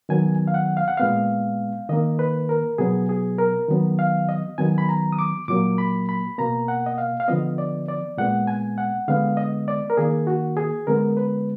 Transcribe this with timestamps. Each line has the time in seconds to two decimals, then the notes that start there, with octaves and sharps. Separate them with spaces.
0.09 D#3 F#3 B3 G#5
0.48 F5
0.54 F#5
0.77 F5
0.88 F#5
0.97 A#2 G#3 B3 F5
1.89 D#3 A#3 D#5
2.19 B4
2.49 A#4
2.78 B2 F#3 B3 G#4
3.09 G#4
3.39 A#4
3.68 D#3 F#3 B3
3.99 F5
4.29 D#5
4.58 D#3 F#3 B3 G#5
4.78 B5
4.89 A#5
5.12 D#6
5.19 D6
5.48 A#2 F#3 A#3 D6
5.78 B5
6.09 B5
6.38 B2 A#3 A#5
6.68 F#5
6.86 D#5
6.98 F5
7.20 F5
7.28 D3 F3 B3 D#5
7.58 D5
7.88 D5
8.18 A#2 G#3 B3 F#5
8.47 G#5
8.78 F#5
9.08 D3 G#3 B3 F5
9.37 D#5
9.68 D5
9.90 A#4
9.97 D#3 A#3 G#4
10.27 F#4
10.57 G#4
10.87 D3 G#3 B3 A#4
11.17 B4